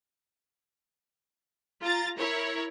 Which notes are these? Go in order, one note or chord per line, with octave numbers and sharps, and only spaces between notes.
F4 A#5 A6
E4 A#4 C#5